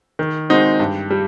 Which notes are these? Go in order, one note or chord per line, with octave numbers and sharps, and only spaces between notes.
D#3
G#3 C4 D#4 F#4
G2
G3